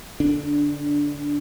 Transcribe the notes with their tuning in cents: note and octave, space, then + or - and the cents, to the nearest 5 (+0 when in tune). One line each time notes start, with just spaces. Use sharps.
D3 -15 D4 +0